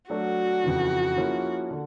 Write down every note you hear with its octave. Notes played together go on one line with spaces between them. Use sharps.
F#3 A3 D4 F#4
F2 C#3 E3
F3 A#3 C#4 E4 G#4
D3